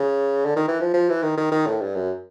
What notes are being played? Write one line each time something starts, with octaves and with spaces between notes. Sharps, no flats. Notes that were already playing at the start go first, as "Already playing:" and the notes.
Already playing: C#3
D3
D#3
E3
F3
F3
E3
D#3
D#3
D#3
A2
G2
F#2